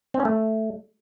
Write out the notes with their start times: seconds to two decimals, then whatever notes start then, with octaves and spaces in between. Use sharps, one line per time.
0.14 C4
0.20 C#4
0.25 A3